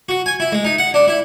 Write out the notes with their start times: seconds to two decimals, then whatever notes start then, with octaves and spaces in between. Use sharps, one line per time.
0.09 F#4
0.26 G#5
0.40 E4
0.52 G#3
0.65 D#4
0.78 F#5
0.94 D4
1.08 E4